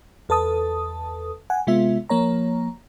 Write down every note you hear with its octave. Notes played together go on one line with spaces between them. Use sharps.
E2 A4 B4 A5 D#6
F#5 G#5
C3 G#3 B3 F4 E5
F3 A#3 C#5 A#5